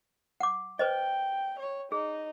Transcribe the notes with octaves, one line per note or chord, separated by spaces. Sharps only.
F#5 D6
B4 C5 D#5 G5
C#5
D#4 G#4